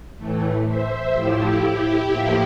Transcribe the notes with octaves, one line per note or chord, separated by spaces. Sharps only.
A2 E3 A3
C5 E5
A2 F3 A3 E4 G4
E4 G4
A2 F3 A#3